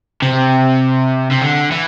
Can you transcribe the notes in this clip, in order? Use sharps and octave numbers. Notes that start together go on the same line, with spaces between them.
C3
C3
D3
E3